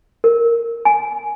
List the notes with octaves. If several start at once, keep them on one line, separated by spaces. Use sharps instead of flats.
A#4
G#5